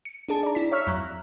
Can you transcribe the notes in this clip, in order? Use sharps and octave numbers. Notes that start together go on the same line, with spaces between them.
C#7
D4 D#4 G#4 A5
D5 A#5
E4 B6
C#5 E5 C#6 E6 F6 B6
F2 F#3 A#5 F#6